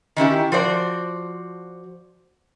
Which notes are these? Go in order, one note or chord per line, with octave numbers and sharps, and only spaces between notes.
D#3 C#4 E4 G4
F3 F#4 C5 D5